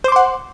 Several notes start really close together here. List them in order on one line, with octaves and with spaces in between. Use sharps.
C5 D6 C6 F#5